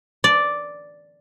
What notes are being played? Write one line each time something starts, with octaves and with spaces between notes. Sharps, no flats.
D5